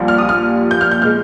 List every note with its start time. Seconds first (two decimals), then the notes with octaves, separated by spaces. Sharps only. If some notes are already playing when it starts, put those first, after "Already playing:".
Already playing: A#1 A#2 G3
0.08 F6
0.18 D#6
0.29 F6
0.71 G6
0.81 F6
0.91 G6
1.02 A#2 G#3 F6